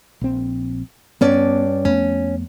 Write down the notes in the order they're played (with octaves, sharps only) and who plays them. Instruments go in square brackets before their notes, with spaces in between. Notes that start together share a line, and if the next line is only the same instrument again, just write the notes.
[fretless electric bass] A#1 C4
[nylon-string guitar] G2 C#4 D5 [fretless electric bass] B3
[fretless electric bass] F2 A3 B3 [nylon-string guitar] C#4